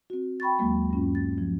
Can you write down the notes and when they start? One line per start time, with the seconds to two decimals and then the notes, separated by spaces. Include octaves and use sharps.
0.10 C4 F#4
0.40 G5 B5 C#6 A6
0.59 D#2 F#3 G#3 A#3
0.91 G2 C#4 F4
1.15 A6
1.38 F3